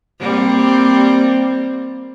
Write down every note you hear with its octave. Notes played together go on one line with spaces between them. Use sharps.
G3 A#3 C4